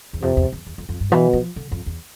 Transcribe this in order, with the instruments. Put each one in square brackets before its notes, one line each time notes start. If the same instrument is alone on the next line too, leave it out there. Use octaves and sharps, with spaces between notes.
[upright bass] E2
[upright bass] F2 [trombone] C3
[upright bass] E2
E2
E2
F2
F2
G2
[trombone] B2 [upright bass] E3
[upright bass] F3
D3
F2
E2